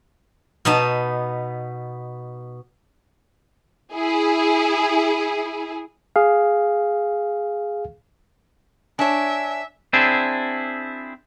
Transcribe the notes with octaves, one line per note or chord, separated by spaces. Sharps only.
B2 B3 D#4 A5
E4 G#4
G#4 F5
D4 C#5 E5 G#5
C4 D4 E4 G#4